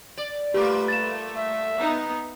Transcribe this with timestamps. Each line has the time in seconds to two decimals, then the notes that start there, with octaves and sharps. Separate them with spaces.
0.17 D5
0.54 G3 A3 A#3 F4 G4 B4 D6
0.88 A6 E7
1.37 E5
1.79 B3 D#4